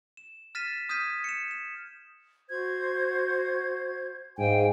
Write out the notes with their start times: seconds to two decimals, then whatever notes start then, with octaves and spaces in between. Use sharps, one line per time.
0.17 E7
0.55 F6 A6 B6 D#7 E7
0.89 D#6 F6 G6 G#6 B6 D#7
1.24 C#7 E7
1.51 E7
2.49 F#4 C5 G#6
4.38 G#2 F5 G5 G#5